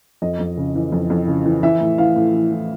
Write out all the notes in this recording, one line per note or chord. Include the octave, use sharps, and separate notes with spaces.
F2 D#5
F2
C#3
E3
F2
F2
C#3
E3
E3 E5
A2
E3 F5
A2
E3
A2